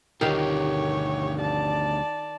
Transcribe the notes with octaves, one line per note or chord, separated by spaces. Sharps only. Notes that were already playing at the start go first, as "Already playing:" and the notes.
D2 D#3 G3 G4 C#5 F5
D5 A5